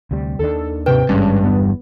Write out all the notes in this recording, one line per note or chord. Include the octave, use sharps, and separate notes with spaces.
D2 C3 G3
D#2 D#3 D4 A4
G#2 C3 B4 G5
G#1 G2 G#3 C#4
G1 E2 B3